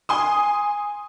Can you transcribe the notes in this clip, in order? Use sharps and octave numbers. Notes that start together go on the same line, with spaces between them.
G#5 C6 D#6